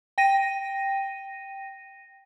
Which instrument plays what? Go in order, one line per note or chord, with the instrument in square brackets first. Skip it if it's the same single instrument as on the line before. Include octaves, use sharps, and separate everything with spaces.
[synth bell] G5 A#6 D#7